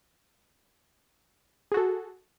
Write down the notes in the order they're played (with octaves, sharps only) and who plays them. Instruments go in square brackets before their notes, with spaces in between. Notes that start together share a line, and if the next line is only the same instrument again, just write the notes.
[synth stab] G#4
F#4
A4